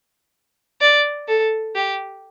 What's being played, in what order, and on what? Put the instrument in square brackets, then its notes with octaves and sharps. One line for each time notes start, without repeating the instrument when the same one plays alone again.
[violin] D5
A4
G4